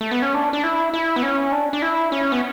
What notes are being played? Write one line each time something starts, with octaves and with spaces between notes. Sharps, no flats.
A3
B3
C#4
D4
D4
E4
E4
B3
C#4
D4
D4
E4
C#4
B3